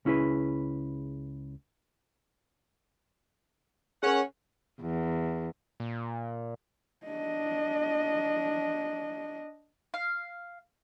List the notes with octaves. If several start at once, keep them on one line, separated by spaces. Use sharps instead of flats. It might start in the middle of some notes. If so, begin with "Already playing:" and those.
C#2 C#4 E4 G#4 B4
C#4 G#4 A#4 C#5 F#5
E2
A#2
D4 D#5
F5